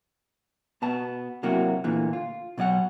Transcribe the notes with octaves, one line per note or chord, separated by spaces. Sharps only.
B2 B3 A5
C3 F#3 A#3 E4 F#4
D2 A#2 D3 E3
F4
B2 F#3 D5 F#5